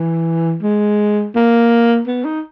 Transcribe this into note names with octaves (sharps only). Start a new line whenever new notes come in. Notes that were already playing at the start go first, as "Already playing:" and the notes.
Already playing: E3
G#3
A#3
B3
D#4